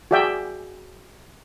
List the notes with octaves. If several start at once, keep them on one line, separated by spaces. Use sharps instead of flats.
F#4 G#4 D5 E5 G5